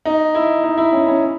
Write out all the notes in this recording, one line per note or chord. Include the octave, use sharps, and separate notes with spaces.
D#4
E4
D#4
E4
C#4
C#4